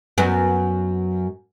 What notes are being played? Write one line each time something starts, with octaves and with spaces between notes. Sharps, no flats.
F#2 B3